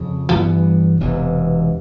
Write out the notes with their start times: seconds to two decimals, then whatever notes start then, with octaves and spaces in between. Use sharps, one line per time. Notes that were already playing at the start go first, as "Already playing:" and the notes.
Already playing: F2 C#3 F3
0.32 G2 E3 G3 B3
1.00 E1 E2 C3 E3